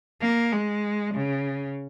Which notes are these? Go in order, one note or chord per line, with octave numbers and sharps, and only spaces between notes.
A#3
G#3
C#3